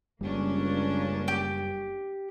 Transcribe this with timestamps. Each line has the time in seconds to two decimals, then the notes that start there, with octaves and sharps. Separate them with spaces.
0.21 F#1 C#2 G3 A#3 C#4 D4
1.28 G4